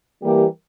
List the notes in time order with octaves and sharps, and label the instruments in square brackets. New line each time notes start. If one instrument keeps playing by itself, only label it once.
[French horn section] E3 G3 A#3 G4 A#4